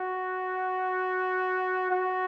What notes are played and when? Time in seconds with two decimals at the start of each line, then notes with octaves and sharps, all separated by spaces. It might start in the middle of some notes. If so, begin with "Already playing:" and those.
Already playing: F#4
1.91 F#4